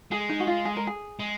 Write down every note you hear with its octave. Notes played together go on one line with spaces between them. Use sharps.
G#3 G#4
D#4
F#4
F4
G#4
A#4
G#4
G#3